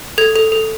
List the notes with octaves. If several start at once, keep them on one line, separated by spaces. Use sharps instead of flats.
A4 G#6
A4
A4